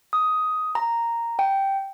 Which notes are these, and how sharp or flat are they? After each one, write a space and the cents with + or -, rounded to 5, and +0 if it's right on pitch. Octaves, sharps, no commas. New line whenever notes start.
D#6 +10
A#5 -5
G5 -5